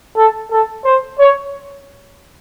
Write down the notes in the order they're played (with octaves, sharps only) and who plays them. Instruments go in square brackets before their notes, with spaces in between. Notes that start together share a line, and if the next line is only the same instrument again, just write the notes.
[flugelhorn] A4
A4
C5
C#5